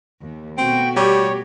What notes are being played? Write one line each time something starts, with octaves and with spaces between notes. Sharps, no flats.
D#2
B2 A3 C4 F#4 G5
G3 G4 C#5